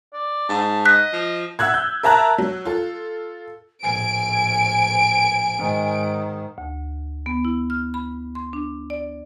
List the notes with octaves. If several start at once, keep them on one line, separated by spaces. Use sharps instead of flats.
D5
G#2 A5
D#5 F#6 B6
F3
E5 F#5 E6 F#6 G#6
G6
A#4 E5 A5 A#5 F#6
F#3
F4 A4
A#1 A2 G#5 D7
G#2 D#3
D2
B3
E4
F6
B5
C6
D4
D5